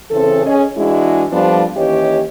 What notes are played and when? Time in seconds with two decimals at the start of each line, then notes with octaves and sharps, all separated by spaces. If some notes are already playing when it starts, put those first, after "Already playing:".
0.11 C#3 E3 C4 A4
0.46 C#4 G#4 D#5
0.77 E3 G#3 D4 E4 F#4 G#4
1.32 F2 F3 G3 B3 D4 F4
1.76 D#2 E3 C#4 G4 C#5 D#5